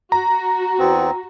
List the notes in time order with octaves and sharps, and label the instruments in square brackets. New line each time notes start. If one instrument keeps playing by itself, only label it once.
[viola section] F#4 [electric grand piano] A#5
[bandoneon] E2 B3 C4